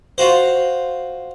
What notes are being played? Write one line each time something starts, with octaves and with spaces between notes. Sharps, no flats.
F4 F#4 C5